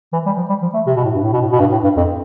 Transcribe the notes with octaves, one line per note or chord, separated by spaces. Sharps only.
E3
G3
F3
G3
F3
A3
C3
B2
A2
G2
A2
B2
A2
B2
G2
A2
G2
F2